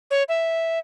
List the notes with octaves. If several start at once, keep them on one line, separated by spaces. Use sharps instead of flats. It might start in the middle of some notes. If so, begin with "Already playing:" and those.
C#5
E5